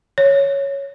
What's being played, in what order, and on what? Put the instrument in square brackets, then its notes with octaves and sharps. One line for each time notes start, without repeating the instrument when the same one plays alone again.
[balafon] C#5